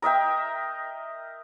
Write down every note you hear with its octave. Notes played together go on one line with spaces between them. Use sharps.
A#4 D#5 E5 G5